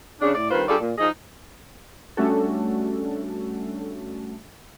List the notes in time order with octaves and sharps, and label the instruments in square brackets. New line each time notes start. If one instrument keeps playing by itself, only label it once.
[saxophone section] C#3 D4
A2 D5
G2 D#3 C4 F4 B4 C5
G3 D4 F4 G#4 A4 D5
A#2
F3 D#4 G#4 D#5
[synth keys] G3 A3 C#4 D4 F#4 A4